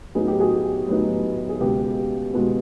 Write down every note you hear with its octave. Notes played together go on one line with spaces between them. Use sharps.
A2 F#3 B3 D#4 G#4
G4
F#4 G#4
A2 F#3 B3 D#4
G#4
C#2 B2 G#3 B3 G4
B2 G#3 B3 F#4